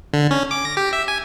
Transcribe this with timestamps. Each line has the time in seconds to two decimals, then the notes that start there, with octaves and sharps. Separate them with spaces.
0.13 D3
0.31 C#4
0.51 D6
0.65 A#6
0.77 G4
0.93 E5
1.08 G#5